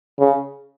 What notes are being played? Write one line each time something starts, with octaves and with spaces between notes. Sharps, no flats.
C#3